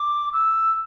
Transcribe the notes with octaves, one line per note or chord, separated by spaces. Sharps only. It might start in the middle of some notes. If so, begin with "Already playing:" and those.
Already playing: D6
E6